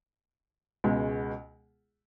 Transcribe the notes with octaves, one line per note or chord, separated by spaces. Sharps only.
C#2 B2 G#3